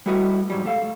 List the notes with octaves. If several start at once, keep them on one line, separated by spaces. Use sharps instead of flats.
G3 A3 E4 F#4 B4 D#5
G#2 F#3 G3
C#2 A3 A4 F5